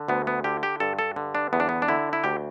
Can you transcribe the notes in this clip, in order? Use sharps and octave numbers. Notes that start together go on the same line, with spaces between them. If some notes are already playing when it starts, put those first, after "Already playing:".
Already playing: D3
D2 B3
B3
D3 G4
G4
G2 A4
A4
D3
D4
E2 B3
D4
B3
D4
D3 E4
E4
D2 G4